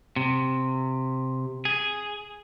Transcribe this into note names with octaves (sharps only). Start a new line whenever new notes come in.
C3
G#4